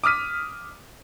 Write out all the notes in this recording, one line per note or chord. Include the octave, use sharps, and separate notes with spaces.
D6 D#6 F6 B6 D#7